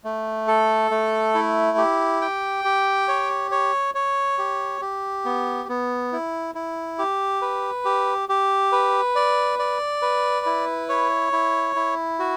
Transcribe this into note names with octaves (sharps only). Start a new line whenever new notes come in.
A3
A4
A3
E4
G4
G5
G4
C#5
C#5
C#5
G4
G4
B3
B3
E4
E4
G4
B4
G4
G4
B4
D5
D5
B4
E4
C#5
E4
E4
F#4